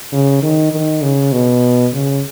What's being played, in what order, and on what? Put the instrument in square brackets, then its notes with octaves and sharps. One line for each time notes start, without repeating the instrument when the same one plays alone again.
[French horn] C#3
D#3
D#3
C#3
B2
C#3